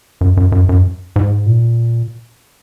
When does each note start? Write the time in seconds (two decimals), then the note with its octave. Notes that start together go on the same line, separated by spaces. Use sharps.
0.21 F#2
0.37 F#2
0.52 F#2
0.69 F#2
1.16 G#2
1.46 A#2